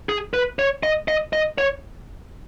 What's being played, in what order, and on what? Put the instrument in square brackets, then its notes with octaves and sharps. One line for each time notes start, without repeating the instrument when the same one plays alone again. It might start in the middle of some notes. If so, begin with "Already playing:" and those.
[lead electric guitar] G#4
B4
C#5
D#5
D#5
D#5
C#5